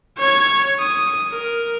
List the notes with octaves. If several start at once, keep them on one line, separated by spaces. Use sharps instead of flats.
C#5 G#6
D#6
A#4